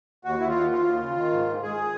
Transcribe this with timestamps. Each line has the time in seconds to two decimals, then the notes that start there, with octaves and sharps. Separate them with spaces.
0.24 D#2 F#4
0.40 D#2 E4
0.48 F4
0.55 D#2
0.70 F3 F4
0.86 D#2
1.01 C#3
1.17 D#3
1.31 G#2
1.46 G#2
1.62 G#2 G#4